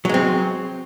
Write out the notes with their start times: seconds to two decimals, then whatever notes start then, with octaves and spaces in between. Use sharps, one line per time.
0.05 F#3
0.09 G#3
0.14 C4